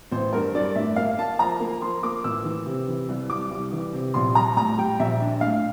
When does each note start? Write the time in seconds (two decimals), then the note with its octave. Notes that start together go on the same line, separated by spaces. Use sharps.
0.12 A1 C5
0.33 G2 A#4
0.55 G2 D5
0.76 A2 E5
0.96 A#3 F5
1.17 A#3 A5
1.39 F3 A#5
1.60 A#3
1.81 F3 C6
2.03 A#3 D6
2.24 A1 E6
2.45 E3
2.66 C3
2.88 E3
3.09 C2
3.30 C2 D6
3.51 C2
3.72 E3
3.94 C3
4.14 A#1 C6
4.35 G3 A#5
4.56 A2 A#5
4.78 G3 G5
4.99 A#1 E5
5.21 D4
5.41 A2 F5